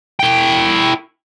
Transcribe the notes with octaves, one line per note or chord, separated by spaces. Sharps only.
E4 G5